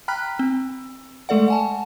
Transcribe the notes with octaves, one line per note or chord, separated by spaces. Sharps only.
G5 A#5 B5 F6 F#6 B6
C4
G#3 A3 A4 D5 F#5
F#5 G#5 A5